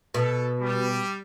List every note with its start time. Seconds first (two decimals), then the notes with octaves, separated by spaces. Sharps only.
0.14 B2 A4
0.60 G3